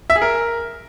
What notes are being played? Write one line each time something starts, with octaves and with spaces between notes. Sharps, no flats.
E5
G#4
A#4